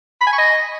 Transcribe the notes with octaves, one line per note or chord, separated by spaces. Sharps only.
B5
G#5
C#6
D#5